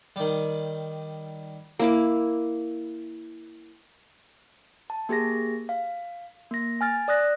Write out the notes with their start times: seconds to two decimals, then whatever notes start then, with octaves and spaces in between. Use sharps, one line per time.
0.16 D#3 G3
1.79 A#3 E4 D6
4.90 A5
5.09 A#3 G4 G#4 A#6
5.69 F5
6.51 A#3 A#6
6.81 G#5 F6 A6
7.08 D5 D#6 F#6 A#6